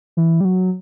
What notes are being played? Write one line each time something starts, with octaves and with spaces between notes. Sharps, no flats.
E3
G3
F#3